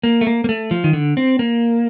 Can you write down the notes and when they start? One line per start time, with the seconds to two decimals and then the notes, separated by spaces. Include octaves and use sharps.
0.03 A#3
0.21 A3
0.27 A#3
0.44 A#3
0.49 A3
0.71 F3
0.84 D#3
0.93 D3
1.17 C4
1.39 A#3